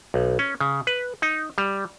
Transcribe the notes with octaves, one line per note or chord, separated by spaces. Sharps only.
B1
C#4
C#3
B4
D#4
G3